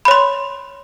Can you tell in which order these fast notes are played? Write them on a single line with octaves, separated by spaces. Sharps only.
B5 C#5 C6